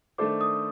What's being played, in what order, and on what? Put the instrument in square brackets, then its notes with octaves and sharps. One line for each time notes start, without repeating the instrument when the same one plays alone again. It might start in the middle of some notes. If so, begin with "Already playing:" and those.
[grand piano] D#3 A3 D4 A4 C5 [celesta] D6
[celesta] D#6